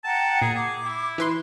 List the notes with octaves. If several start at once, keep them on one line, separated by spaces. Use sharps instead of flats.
F#5 G5 A5 A#5
A#2 G#4
G#4 D6
E4
E3 B4 C6